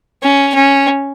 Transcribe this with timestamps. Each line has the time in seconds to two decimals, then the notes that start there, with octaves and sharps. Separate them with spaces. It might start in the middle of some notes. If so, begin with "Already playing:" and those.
0.23 C#4
0.54 C#4